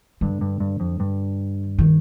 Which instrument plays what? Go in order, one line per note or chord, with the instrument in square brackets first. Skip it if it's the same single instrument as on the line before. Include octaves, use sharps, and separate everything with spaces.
[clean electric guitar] G2 [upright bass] D3
[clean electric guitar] G2
G2
F2
G2
[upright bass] D#3